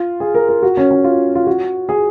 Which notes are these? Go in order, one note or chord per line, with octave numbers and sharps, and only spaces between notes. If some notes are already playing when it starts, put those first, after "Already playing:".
Already playing: F4
G#4
A#4
A#4
F#4
C#4
C#4
F4
F4
F#4
G#4